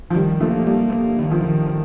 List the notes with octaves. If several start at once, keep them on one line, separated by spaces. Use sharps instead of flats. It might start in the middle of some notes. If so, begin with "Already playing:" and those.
F3
D#3 G3
F3 A3 A#3
G3 A#3
A#3
D#3
F3
D#3
D#3